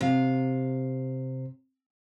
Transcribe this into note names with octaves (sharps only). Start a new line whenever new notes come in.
C3 F5